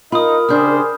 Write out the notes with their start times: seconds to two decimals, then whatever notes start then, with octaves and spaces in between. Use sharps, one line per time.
0.12 D#4 F4 A#4 B5 D#6
0.49 C#3 D4 G4 G#4 C5 F6 G6